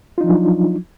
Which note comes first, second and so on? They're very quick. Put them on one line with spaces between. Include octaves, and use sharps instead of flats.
F4 D#4 F3 D4 F#3